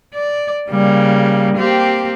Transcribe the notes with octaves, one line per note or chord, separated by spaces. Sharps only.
D5
C#3 G3 A#3
A#3 C4 G4